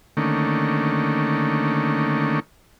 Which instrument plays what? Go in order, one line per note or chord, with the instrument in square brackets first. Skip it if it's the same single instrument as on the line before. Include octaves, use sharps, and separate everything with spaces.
[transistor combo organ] D3 D#3 A3 A#3 C#4